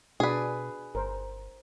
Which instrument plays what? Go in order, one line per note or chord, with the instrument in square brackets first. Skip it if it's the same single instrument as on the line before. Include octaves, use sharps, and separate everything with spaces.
[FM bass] B2 [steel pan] D4 F#4 D5 [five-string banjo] G#4 B4
[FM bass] G1 [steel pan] A#4 C5